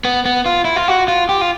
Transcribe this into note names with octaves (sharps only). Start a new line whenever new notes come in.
B3
B3
F4
E4
F4
F#4
F4
G4
F4